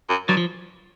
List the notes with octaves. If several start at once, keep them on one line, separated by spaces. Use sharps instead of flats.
F#2
G2 F#3
F3